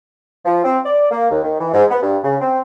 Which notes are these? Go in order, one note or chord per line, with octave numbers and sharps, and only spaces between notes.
F3
C4
D5
A#3
D#2
D#3
E3
G#2
B3
G2
C#3
C4